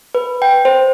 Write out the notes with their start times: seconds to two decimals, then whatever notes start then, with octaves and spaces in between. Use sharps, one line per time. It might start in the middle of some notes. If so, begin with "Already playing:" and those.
0.15 B4
0.42 G5
0.65 C5